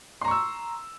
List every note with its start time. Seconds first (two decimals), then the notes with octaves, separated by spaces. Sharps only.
0.21 C6
0.25 A#5
0.28 C#6
0.31 E6